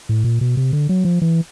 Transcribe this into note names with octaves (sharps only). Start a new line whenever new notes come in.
A2
A#2
B2
C3
D3
F#3
F3
E3